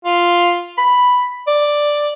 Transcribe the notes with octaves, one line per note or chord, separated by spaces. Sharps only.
F4
B5
D5